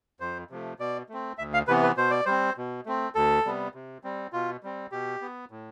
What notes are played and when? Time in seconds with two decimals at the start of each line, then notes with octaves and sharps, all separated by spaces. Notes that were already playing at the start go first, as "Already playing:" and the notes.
0.20 F2 C5
0.50 C3 F3 A3
0.79 B2 D5
1.09 A3 C4
1.38 D2 E5
1.54 F5
1.68 C3 E3 B3 B4
1.83 B4
1.97 B2 C5
2.11 D5
2.26 G3 C4 C5
2.57 B2
2.86 A3 C4
3.15 D2 A4
3.45 C3 G3 B3
3.74 C3
4.04 G3 C4
4.33 B2 F4
4.63 G3 C4
4.92 B2 G4
5.22 B3
5.51 A2